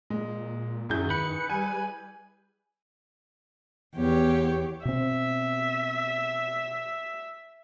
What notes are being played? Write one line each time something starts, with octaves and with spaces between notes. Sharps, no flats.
A#2 G#3
F#2 D#3 E4 G#4 G6
B4 C#7
G3 G#5
E2 B3 G4 C#5
B2 C4 E5